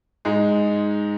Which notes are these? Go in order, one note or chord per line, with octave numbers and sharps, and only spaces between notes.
G#2 G#3